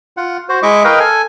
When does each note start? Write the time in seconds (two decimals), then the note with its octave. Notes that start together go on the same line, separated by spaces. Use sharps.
0.17 F4 F#5
0.49 F#4 C5
0.63 G#3 E4 D#5 E5 C#6 D6
0.84 A#4 B4 D#5 F5 G5
0.99 A4 G#5